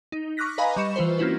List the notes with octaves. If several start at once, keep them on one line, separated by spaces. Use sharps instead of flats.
D#4
C#6 D6 F6 F#6 A#6 B6
B4 D#5 F5 G#5 A#5 B5
G3 D#5 B5 C#6 C#7 E7
E3 F4 B4 C5
A#3 C4 C#4 E4 F#4 B4